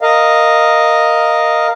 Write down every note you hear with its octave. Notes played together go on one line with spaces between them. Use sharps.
A#4 D#5 F5